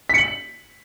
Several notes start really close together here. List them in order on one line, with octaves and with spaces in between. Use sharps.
B6 C#7 F#7